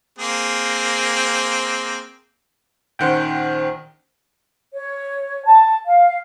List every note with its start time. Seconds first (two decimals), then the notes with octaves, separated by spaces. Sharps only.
0.19 A#3 C4 G#4
2.99 A#1 D#3 C#4 C5 F#5 G5
4.74 C#5
5.45 A5
5.85 F5